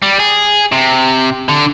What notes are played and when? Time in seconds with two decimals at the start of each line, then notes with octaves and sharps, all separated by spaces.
0.02 G3
0.20 G#4
0.72 C3
1.49 D3